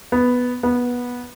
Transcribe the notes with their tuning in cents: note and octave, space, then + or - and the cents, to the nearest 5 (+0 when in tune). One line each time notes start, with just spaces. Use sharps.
B3 +0
B3 -15